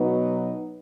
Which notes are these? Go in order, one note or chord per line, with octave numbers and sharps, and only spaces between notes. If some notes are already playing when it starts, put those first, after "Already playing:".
Already playing: B2 F#3 B3 D#4